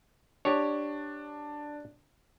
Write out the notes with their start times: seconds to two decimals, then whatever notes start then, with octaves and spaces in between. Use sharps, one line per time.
0.45 D4 G4 C#5